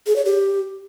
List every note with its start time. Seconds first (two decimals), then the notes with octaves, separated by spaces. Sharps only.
0.07 G#4
0.16 C#5
0.25 G4